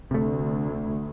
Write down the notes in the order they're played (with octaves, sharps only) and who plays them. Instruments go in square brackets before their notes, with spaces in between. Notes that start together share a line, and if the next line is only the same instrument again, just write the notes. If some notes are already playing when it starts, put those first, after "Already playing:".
[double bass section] D2 [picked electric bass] C3 A3